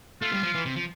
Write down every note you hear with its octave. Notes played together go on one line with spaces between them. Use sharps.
A3 F4
G3
F3
E3
C3
F3